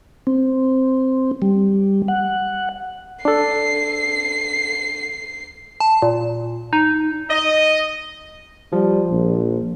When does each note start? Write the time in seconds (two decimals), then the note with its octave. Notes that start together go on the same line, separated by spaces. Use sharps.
0.27 C4
1.42 G3
2.08 F#5
3.25 D4 A4 C7
5.80 A5
6.02 A#2
6.73 D#4
7.29 D#5
8.72 F3 G3
9.09 A#1